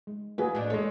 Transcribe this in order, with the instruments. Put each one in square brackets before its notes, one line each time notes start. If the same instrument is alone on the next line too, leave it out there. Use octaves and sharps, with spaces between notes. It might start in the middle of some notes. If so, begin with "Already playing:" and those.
[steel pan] G#3
[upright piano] E3 [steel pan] A#3 F#4 G#4 [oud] B4
[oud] A2 D4
[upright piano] G#3 A3 [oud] C#5